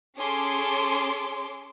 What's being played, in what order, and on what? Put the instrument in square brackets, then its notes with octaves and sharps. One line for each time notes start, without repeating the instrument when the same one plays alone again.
[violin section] C#4 G#4 A4 C#5 C6 D6